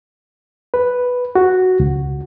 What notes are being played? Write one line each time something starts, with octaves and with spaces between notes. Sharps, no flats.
B4
F#4
C#2